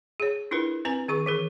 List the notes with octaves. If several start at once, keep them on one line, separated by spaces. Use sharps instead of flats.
G#4 C#5
D4 E4 F4 A#4 B4
C4 B4 G#5 A#5
D#3 G#4 C#6
E3 G#4 A#4